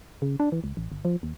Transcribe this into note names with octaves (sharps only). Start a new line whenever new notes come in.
C#3
D4
E3
C#2
A1
G1
F3
D#2